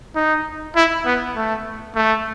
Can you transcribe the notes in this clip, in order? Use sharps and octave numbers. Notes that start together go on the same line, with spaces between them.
D#4
E4
B3
A3
A3